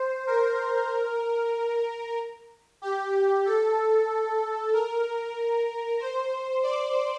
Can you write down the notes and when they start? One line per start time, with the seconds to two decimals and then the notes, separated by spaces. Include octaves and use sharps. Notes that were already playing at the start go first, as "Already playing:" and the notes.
Already playing: C5
0.27 A#4
2.82 G4
3.45 A4
4.73 A#4
6.00 C5
6.63 D5